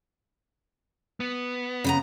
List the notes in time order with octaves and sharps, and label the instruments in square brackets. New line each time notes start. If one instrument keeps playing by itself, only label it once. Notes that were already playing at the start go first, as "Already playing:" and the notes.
[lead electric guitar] B3
[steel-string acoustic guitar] C#3 B3 A#5